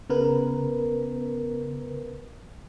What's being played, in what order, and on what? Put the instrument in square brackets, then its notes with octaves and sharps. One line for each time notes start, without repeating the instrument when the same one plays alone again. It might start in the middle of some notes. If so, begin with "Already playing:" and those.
[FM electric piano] C#3 B3 A#4 B4